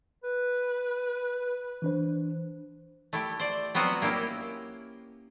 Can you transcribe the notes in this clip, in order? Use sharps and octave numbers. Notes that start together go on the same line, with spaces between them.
B4
E3 D4 C5
A3 E4 G4
C5 D5
F#3 B3 C4 F4 F#4
A#3 C#4 E4 G4